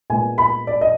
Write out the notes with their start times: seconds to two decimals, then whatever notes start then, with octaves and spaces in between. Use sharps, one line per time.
0.10 A#2 G#3 B3 G#5
0.38 B5
0.67 D5
0.81 D#5